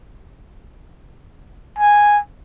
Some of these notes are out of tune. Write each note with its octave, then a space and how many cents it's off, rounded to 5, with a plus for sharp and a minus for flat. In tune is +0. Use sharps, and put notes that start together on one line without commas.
G#5 -5